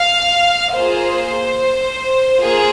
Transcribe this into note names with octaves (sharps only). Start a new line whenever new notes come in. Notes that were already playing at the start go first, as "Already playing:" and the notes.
Already playing: F5
A#3 F4 G#4 C5
A#3 F4 G#4